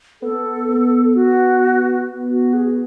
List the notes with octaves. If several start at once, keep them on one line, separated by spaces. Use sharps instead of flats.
B3 A4
B3
F#4
F#4
G#4